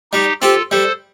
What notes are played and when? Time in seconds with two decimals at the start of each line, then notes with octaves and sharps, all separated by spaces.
0.12 G3 D#4 G4
0.41 C4 F4 G4 A4
0.71 G3 A4 C5